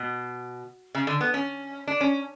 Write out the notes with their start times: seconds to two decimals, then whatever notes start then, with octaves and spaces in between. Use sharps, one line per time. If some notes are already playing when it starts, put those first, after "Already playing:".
Already playing: B2
0.95 C#3
1.07 D3
1.21 B3
1.34 C#4
1.88 D4
2.01 C#4